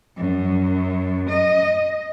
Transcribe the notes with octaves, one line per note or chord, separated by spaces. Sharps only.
F#2
D#5